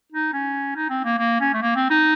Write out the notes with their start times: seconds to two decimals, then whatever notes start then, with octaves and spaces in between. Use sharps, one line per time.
0.12 D#4
0.33 C#4
0.76 D#4
0.90 C4
1.04 A#3
1.18 A#3
1.40 C#4
1.54 A3
1.62 A#3
1.76 C4
1.90 D#4